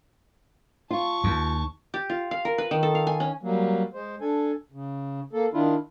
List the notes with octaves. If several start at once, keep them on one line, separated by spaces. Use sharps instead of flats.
F4 A5 C#6
D#2
G4
F4
F5
A#4
B4
D#3
A4
F5
G#5
C#4
F#3 G3 A#3
G#3 C5
D4 A4 G#5
C#3
A#3 A4
D#3 D4 E4 F4